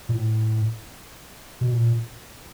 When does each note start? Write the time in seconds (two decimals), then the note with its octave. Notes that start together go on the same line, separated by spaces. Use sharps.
0.09 A#2
0.14 A2
1.61 B2
1.72 A#2